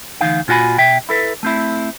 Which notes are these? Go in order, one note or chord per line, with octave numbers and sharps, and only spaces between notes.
D2 E3 D#4 F5
A#2 F4 F#4 G#5 B5
B2 E5 G5
E4 A4 B4
A3 C4 E4